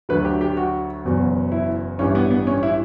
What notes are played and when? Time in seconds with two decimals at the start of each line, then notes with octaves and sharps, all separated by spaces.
0.09 D2 D3 F#3 A3 B4
0.25 G4
0.41 G4
0.57 F#4
1.04 F#1 E2 B2 F#3
1.52 E4
1.99 A1 G2 E3 G3 C#4
2.15 B3
2.31 B3
2.47 C#4
2.63 E4